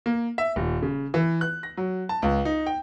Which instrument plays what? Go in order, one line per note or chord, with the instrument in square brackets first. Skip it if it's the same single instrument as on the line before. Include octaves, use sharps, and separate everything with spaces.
[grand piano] A#3
E5
D#1
C#3
E3
F#6
A#6
F#3
A5
C#2
D#4
G5